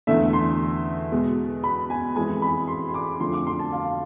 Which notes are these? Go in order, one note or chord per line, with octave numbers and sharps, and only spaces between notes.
E2 D3 A3 E5
C6
B2 G#3
B5
G#5
F2 E3 G#3 G#5
B5
C6
C6
D6
F2 D3 F3 A3 C6
D6
C6
A5
F5